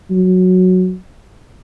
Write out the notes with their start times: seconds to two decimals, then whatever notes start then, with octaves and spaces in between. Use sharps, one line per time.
0.10 F#3